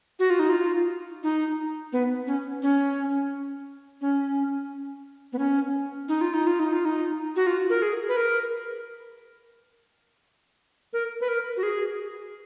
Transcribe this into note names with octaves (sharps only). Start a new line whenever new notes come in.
F#4
F4
D#4
F4
D#4
B3
C#4
C#4
C#4
B3
C#4
D#4
F4
D#4
F4
D#4
F4
D#4
F#4
F4
A#4
G#4
B4
A#4
A#4
B4
A#4
F#4
G#4